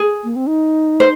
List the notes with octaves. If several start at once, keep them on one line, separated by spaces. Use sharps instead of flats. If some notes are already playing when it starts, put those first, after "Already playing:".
Already playing: G#4
A#3
C4
D#4
C5